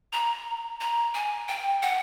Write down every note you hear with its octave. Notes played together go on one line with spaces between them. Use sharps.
A#5
A#5
G#5
G5
F#5